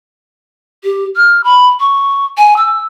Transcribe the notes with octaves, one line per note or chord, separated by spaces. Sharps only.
G4
F6
B5
C#6
G#5
E6